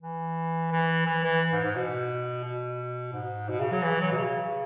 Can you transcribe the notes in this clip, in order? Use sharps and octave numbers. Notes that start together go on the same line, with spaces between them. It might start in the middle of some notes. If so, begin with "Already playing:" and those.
E3
E3
E3
E3
G#2
G#2
B2
B2
G#2
B2
C#3
F#3
E3
F#3
B2
C#3